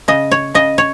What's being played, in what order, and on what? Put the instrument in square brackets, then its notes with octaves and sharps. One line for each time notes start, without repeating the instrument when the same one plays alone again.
[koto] C#3 D#5
C#5
C#3 D#5
C#5